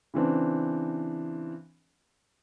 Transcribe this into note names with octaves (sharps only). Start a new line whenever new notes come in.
C#3 E3 C4 D4